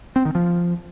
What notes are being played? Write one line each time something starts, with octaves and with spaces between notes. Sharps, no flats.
C4
D#3
F3